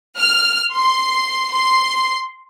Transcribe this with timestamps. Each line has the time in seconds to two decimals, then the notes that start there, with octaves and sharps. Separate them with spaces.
0.18 F6
0.73 C6
1.53 C6